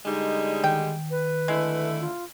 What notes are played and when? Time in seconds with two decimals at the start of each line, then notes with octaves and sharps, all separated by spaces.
0.05 D3 G3 G#3 D#4
0.64 D#3 G5
1.10 B4
1.48 D3 G#3 A3 E4
2.00 F4